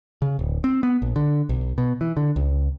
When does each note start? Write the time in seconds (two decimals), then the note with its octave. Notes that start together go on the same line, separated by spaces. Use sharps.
0.22 C#3
0.39 D1
0.64 C4
0.83 B3
1.02 A#1
1.16 D3
1.49 B1
1.78 B2
2.01 E3
2.17 D3
2.36 C#2